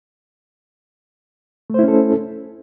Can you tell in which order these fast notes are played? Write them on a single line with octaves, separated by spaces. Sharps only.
A3 C5 E4 C#4 A4